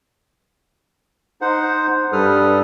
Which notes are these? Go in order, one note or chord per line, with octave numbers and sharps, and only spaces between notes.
D#4 C5 F#5
G2 G3 A4 B4 D#6 F6